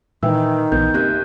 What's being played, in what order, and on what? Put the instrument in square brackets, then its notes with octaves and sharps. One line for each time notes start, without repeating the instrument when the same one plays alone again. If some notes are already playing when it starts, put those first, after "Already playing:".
[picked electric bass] A#2 [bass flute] D#3 [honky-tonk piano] E3 [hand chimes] B4 G5 E6
[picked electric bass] A#1 E3 [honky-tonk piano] B3 [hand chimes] G6
[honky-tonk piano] F#1 [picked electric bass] C4 [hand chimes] G4 F#6 G6